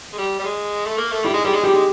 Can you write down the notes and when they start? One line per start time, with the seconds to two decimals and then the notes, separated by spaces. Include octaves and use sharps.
0.13 G#3
0.18 G3
0.39 G3
0.45 G#3
0.85 A3
0.98 A#3
1.11 A3
1.24 G3 E4
1.34 G#3
1.44 G3 G#4
1.54 G#3
1.63 G3 G4
1.74 G#3